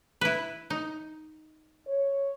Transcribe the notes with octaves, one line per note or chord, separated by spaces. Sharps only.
E4 B4
D#4
C#5